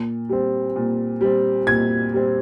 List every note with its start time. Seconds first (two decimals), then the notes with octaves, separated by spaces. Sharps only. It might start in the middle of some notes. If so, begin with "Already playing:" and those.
Already playing: A#2
0.29 G3 C4
0.76 A#2
1.21 G3 C4
1.67 A#2 G#6
2.14 G3 C4